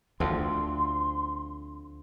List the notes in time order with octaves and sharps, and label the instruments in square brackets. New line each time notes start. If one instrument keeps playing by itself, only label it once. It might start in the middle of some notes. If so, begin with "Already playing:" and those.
[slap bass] D2 [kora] D3 F3 C4 [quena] C6